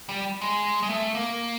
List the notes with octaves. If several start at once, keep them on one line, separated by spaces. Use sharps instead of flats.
G3
G#3
G#3
A3
A#3